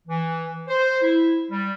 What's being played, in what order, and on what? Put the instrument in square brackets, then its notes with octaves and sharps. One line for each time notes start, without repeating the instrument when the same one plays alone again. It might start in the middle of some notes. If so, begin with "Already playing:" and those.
[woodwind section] E3
C5
E4
G3